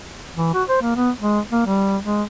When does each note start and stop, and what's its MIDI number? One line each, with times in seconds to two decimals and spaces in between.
0.36 0.52 52
0.54 0.63 66
0.68 0.78 72
0.82 0.95 58
0.96 1.10 59
1.19 1.39 56
1.52 1.62 58
1.66 1.97 55
2.04 2.23 56